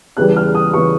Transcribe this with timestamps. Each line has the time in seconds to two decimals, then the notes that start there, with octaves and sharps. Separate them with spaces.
0.17 E2 C#3 E3 G3 F#6
0.36 F6
0.55 D#6
0.73 C#3 E3 G3 C#6